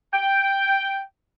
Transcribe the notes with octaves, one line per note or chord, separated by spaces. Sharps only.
G5